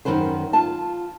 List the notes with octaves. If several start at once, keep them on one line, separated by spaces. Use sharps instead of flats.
F#2 B2 D#3 C#4 B4 C5
F4 A5